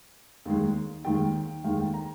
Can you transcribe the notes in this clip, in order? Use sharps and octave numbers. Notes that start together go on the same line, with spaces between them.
D#2 D#3 G#3
D#2 D#3 G#3 G5
D#2 D#3 G#3 F5
G5
A#5